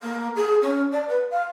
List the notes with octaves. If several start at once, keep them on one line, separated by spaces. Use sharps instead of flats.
A#3
G#4
C#4
D5
B4
F5